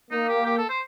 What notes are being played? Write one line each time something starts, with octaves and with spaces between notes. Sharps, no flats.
A#3 D#4
G4
G4
A4
C5